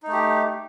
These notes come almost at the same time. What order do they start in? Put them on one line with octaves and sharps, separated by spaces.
D#4 A3 G4